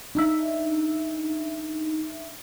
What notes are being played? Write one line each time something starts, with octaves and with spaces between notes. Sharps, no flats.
D4 D#4 E5